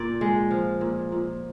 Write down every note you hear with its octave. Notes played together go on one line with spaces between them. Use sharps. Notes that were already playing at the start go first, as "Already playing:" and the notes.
Already playing: A#2 D5
G#3
F3
A#2
A#2